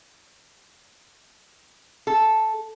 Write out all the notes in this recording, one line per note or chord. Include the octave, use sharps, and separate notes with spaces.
A4